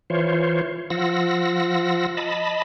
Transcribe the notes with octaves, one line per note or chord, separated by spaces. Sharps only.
E3 F4 C5 C#5
F3 F4 F#5 E6 A#6
D#5 A5 B5